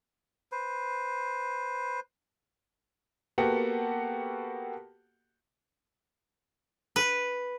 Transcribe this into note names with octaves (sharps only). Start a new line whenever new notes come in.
B4 C5
A#3 B3 F#4 G4 A4 F#5
B4